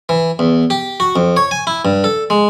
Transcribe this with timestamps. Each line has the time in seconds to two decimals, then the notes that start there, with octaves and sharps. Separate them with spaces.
0.09 E3
0.39 E2
0.70 G4
1.00 F#4
1.16 F2
1.37 C#5
1.51 G#5
1.67 E4
1.85 G2
2.04 A4
2.30 G#3